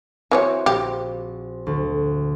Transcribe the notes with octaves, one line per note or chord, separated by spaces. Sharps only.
E3 C4 F#4 G#4 C#5
A#1 G4
D2